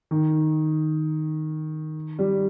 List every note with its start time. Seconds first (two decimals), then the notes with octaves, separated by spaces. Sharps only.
0.11 D#3
2.19 G3